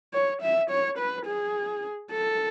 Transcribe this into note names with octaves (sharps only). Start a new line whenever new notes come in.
C#5
E5
C#5
B4
G#4
A4